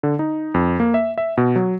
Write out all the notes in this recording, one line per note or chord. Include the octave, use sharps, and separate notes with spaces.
D3
D#4
F2
A#3
E5
E5
B2
F#3